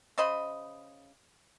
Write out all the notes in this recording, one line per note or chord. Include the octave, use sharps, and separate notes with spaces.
C#3 C5 D#5 B5